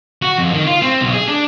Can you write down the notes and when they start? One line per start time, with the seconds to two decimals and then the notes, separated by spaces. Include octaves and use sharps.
0.22 F#4
0.38 F2
0.54 D#3
0.67 F4
0.82 C4
1.01 B1
1.14 G#4
1.28 D4